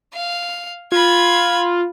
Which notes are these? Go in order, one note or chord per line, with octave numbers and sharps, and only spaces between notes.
F5
F4 B5 G#6